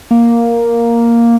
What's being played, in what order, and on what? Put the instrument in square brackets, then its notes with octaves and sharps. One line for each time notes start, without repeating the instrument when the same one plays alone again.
[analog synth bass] A#3